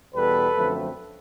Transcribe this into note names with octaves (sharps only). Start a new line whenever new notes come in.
E2 B2 G3 B3 A4 B4
F#2 D3 F3 A3 C4